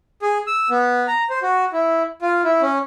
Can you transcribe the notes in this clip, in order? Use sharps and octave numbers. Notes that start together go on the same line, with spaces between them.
G#4
E6
B3
A#5
C5
F#4
E4
F4
E4
C#4